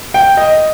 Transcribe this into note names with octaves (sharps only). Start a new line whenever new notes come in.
G5
D#5